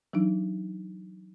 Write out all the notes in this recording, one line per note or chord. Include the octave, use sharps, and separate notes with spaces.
E3 F#3 D4 D#4